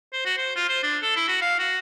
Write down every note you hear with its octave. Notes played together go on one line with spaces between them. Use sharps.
C5
F#4
C5
F4
C5
D4
A4
E4
F#4
F5
F#4